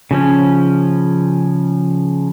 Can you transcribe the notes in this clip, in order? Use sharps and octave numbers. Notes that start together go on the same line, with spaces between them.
C#3 F3 C#4